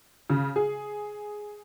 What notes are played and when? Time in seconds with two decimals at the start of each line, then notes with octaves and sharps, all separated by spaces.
0.30 C#3
0.56 G#4